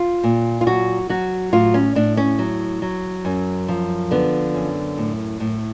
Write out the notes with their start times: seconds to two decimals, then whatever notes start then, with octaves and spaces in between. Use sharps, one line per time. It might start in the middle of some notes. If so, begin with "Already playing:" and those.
Already playing: F4
0.24 A#2
0.61 F4
0.66 F#3 F#4
1.09 F#3 F#4
1.53 A2 F4
1.74 C#4
1.95 A2 D4
2.17 C#4
2.39 F#3
2.82 F#3
3.25 F#2
3.68 F3
4.11 D3 B3
4.54 F#2
4.98 A2
5.40 A2